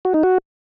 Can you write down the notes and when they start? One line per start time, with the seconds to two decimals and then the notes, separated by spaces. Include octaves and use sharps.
0.05 F#4
0.14 D#4
0.23 F#4